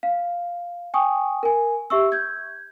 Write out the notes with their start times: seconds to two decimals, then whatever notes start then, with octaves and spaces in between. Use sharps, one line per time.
0.03 F5
0.94 G5 G#5 C#6 D#6
1.43 A#4 G#5
1.90 G4 E5 C#6 E6
2.12 G6 G#6